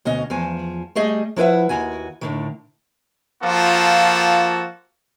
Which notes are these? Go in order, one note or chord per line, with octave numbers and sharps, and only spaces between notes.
D2 B2 C#4 D#5
E2 F3 G#5
G3 A3 G#4 D#5
F3 E4 B4 E5 F#5
D#2 F#4 G#5
A2 D3 D#3
F3 A#3 F4 F#4 A4